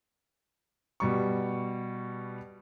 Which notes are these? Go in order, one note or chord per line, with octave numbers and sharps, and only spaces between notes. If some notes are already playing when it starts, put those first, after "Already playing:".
B2 G3 C#6